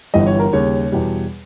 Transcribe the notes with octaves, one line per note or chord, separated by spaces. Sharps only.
G1 G2 E3 G3 D#5
C#5
A#4
D#2 C#3 G3 C#5
E2 B2 G3